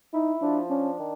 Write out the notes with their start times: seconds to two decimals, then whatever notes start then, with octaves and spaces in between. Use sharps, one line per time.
0.13 D#4 E4
0.42 F3 D4
0.70 C#4 D4
0.98 D#3